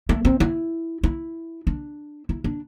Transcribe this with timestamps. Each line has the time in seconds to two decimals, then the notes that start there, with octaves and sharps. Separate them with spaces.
0.09 A3
0.25 C4
0.40 E4
1.03 E4
1.67 D4
2.29 E4
2.44 D4